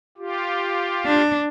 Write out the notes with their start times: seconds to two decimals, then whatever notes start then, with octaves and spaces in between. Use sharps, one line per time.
0.18 F4 G4
1.05 D4